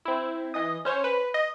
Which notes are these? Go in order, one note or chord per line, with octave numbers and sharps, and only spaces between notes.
C4 E4
E3 D#5 D#6
C#4 C5 C#5
B4
D#5